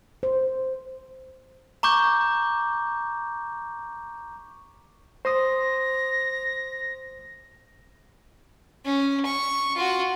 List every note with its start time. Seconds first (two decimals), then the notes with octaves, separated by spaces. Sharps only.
0.23 C5
1.83 A#5 C#6 D6 G6
5.25 C5 C6 D#6 A#6
8.85 C#4
9.26 C#6
9.76 F4 F#4